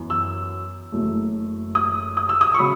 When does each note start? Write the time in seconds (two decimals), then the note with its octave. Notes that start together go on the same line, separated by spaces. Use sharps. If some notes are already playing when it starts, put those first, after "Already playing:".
Already playing: F#2 E3 B3
0.10 E6
0.92 F#1 F#2 E3 A3
1.75 D#6
2.17 D#6
2.29 E6
2.41 D#6
2.54 C#6
2.59 C#3 F#3 B5